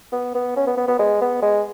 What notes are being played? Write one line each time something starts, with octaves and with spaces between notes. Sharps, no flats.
B3
B3
C#4
B3
B3
B3
G#3
B3
G#3